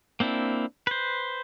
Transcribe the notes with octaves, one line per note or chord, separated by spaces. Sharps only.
A#3 C4 D4 E4
B4 C5